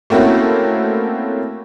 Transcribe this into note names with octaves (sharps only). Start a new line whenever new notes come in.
A3 A#3 C4 C#4 E4 F#4